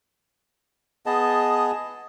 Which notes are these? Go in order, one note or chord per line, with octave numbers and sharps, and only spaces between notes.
B3 G#4 D#5 A5